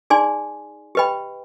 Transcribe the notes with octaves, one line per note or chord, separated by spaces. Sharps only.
D#4 G#4 D5 G#5 C6
G4 B4 D#5 G5 B5